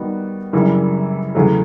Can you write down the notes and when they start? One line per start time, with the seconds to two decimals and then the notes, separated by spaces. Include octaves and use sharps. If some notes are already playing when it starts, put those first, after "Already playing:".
Already playing: D#3 G3 B3 D#4 F#4
0.53 F#2 C#3 E3 G3 A#3
1.35 E2 C#3 F#3 A3